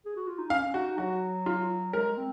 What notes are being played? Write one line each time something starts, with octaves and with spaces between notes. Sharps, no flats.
G#4
F#4
F4
D#4
C#4 F5
C#4
D#4 F#4
F#3 F#4
F4
G#3 A#4
C4